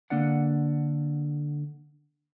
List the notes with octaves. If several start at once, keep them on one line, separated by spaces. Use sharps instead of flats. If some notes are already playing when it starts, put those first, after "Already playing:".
D3 A#3 D4 D5 F#5